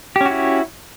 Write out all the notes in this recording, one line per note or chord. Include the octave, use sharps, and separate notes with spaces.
C#4 E4 F#4 G4